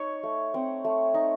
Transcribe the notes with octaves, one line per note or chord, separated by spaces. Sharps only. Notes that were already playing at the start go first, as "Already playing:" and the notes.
Already playing: D#4 C#5
A3
C4
A3
D#4